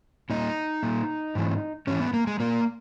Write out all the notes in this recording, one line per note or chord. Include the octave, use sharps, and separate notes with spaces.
A#2 D#4
A#2
G#2 E3
G#2 E3 C#4
B3
A#3
G#3
A#2 A#3